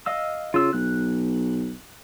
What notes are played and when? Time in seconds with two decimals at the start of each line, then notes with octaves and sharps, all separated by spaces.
0.06 D#5 F5 E6
0.54 C#3 F4 E6
0.73 B1 F#6